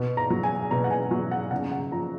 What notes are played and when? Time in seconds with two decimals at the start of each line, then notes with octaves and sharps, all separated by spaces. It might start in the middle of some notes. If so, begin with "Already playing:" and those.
Already playing: B2
0.17 A#5
0.30 F#3
0.43 G#5
0.71 B2 A#5
0.84 F#5
0.91 G#5
1.11 F#3
1.31 F#5
1.51 C#3 F#5
1.72 F#5
1.92 F3 A#5